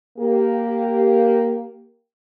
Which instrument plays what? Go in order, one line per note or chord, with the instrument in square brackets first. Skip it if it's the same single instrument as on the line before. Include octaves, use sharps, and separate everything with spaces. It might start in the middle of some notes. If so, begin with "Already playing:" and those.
[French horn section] A#3 G4